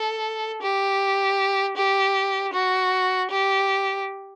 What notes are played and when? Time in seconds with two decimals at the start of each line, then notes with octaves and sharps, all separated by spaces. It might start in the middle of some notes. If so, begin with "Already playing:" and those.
Already playing: A4
0.63 G4
1.77 G4
2.54 F#4
3.31 G4